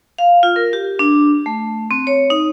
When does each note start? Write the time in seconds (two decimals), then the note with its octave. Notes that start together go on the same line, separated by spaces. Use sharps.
0.18 F5
0.43 F4
0.56 A#4
0.73 G4
0.99 D4
1.46 A3
1.91 C4
2.07 C#5
2.30 D#4